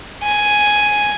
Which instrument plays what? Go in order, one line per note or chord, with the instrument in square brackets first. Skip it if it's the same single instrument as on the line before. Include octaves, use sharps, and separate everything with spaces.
[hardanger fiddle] G#5